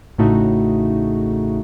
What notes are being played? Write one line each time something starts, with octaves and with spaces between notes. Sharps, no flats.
A1 A2 C#3 A3 D#4 F#4